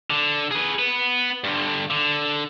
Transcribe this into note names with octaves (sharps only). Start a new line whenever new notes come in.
D3
G#4 B4
B3 B4
G2 D3
D3